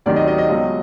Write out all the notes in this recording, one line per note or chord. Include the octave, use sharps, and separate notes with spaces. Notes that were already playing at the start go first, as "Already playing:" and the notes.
D2 C3 D#3 F#3 D5
D#5
D#5
D#5
C#2 B2 F#3